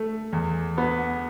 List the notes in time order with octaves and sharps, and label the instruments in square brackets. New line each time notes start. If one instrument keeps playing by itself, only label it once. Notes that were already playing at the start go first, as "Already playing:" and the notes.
Already playing: [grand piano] A3
E2
B3